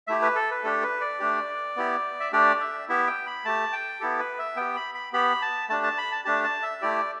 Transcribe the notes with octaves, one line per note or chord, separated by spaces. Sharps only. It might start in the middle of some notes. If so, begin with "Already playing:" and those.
A3 E4 G4 E5
B4
A4
B4
A3 D4 G4 A4
B4
D5
A3 D4 G4
B3 E4 G4
E5
A3 D4 G4 D5
E5
B3 E4 G4 E5
G5
B5
A3 G4 A5
G5
B3 E4 G4 A4
B4
E5
B3 G4 G5
B5
B5
B3 G4 B5
A5
A3 D4 G4 A5
A5
B5
A5
A3 D4 G4 A5
A5
E5
A3 E4 G4 D5